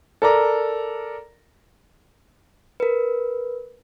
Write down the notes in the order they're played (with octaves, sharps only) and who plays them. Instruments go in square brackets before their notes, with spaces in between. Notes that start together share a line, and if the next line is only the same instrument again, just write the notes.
[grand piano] A4 A#4 D5 A#5
[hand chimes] A#4 B4